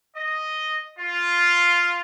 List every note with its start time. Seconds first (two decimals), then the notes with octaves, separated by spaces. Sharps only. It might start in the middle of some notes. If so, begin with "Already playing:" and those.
0.16 D#5
0.99 F4